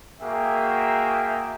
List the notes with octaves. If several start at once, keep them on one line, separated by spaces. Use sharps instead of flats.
A#3 F#4 G#4 A#4 E5 G5